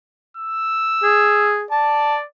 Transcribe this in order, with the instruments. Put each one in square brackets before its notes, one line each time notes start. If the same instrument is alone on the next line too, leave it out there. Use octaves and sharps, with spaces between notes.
[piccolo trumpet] E6
[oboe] G#4
[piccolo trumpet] D5 [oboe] A5